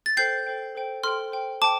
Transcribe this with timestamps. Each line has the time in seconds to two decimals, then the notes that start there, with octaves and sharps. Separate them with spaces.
0.06 A6
0.17 A4 C5 G5 G6 C7
0.46 A4 C5 G5
0.75 A4 C5 G5
1.03 A4 C5 G5 C6 F6
1.32 C5 G5
1.61 C5 G5 A5 D6